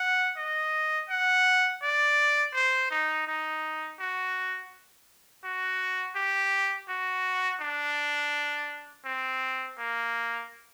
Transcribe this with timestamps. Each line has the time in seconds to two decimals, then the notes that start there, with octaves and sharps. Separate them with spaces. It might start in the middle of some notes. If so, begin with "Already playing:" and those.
Already playing: F#5
0.37 D#5
1.09 F#5
1.82 D5
2.54 C5
2.91 D#4
3.27 D#4
3.99 F#4
5.44 F#4
6.16 G4
6.88 F#4
7.61 D4
9.05 C4
9.78 A#3